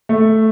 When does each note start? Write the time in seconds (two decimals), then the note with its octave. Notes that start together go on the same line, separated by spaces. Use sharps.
0.09 A3